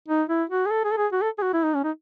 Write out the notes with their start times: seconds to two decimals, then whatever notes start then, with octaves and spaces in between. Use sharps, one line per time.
0.08 D#4
0.29 E4
0.50 F#4
0.66 G#4
0.71 A4
0.84 G#4
0.91 A4
0.97 G#4
1.12 F#4
1.22 A4
1.38 G#4
1.42 F#4
1.53 E4
1.63 D#4
1.74 C#4
1.84 D#4